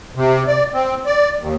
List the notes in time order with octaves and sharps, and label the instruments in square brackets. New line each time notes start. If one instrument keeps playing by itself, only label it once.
[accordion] C3
D5
C4
D5
D#2